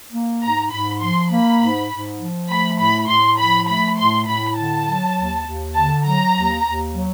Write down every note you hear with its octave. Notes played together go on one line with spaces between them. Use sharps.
A#3
G#2 A#5
G#2 B5
F3 C6
A#3 B5
G#2
G#2
F3
A3 B5
A2 B5
A2 C6
F3 B5
A3 B5
A2 C6
A2 B5
D3 A5
F#3
D#2
D#2
D3 A5
F#3 A#5
D#2
D#2
F#3